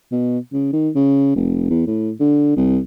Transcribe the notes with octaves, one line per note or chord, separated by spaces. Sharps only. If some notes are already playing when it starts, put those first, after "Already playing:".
B2
C#3
D#3
C#3
F1
E2
A2
D3
C2